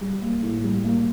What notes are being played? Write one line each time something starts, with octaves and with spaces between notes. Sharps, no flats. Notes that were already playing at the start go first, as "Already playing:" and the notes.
G3
A#3
A2
G3
A#3